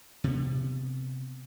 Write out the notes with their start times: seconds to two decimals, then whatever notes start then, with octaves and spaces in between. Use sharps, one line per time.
0.24 C3 B3